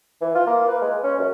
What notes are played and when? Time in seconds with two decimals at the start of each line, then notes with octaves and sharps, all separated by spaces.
0.21 E3
0.35 F4
0.47 A#3
0.68 B4
0.82 G#3
1.04 C#4
1.19 F#2